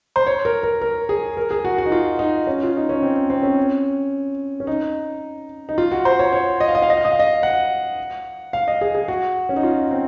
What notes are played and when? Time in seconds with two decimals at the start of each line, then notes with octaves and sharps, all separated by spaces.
0.16 C5
0.27 C#5
0.45 A#4
0.63 A#4
0.81 A#4
1.09 G#4
1.37 A#4
1.51 G#4
1.65 F#4
1.78 F#4
1.86 D#4
1.92 F4
2.19 D#4
2.47 C#4
2.63 F4
2.77 D#4
2.89 C#4
3.02 C4
3.30 C4
3.43 C#4
4.60 C#4
4.67 D#4
5.69 D#4
5.78 F4
5.92 F#4
6.05 C5
6.19 C#5
6.33 C#5
6.60 D#5
6.68 F5
6.75 D#5
6.82 F5
6.90 D#5
6.97 F5
7.05 D#5
7.12 F5
7.19 D#5
7.43 F#5
8.53 F5
8.68 D#5
8.81 G#4
8.94 G#4
9.08 F#4
9.49 C#4
9.56 D#4
9.63 F4
9.91 C4